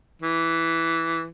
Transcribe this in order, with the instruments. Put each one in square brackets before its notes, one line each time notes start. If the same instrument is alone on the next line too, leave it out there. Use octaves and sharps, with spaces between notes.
[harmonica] E3